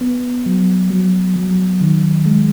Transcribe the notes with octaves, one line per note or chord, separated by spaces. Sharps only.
B3
F#3
F#3
F#3
D#3
G#3